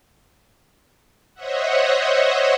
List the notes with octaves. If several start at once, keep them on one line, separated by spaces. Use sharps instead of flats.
C5 C#5 D#5 E5 F#5